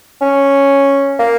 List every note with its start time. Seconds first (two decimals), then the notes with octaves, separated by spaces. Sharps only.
0.22 C#4
1.19 A#3